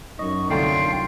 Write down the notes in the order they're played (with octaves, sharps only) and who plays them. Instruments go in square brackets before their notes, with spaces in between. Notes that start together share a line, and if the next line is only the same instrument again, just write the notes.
[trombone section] F#2 F#3 D#4 [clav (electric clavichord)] D#5 [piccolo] C#6
[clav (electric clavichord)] C2 D3 A3 [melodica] F4 G5 [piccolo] C7